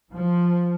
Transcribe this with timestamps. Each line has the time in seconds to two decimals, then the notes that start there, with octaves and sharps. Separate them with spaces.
0.12 F3